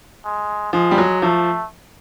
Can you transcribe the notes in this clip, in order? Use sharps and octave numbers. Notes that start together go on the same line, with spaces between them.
G#3
F3 G#3
G3
F#3
F3 A3